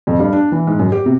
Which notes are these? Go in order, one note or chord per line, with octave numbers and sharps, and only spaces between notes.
F2
G2
D4
E3
G#2
F#2
G4
C3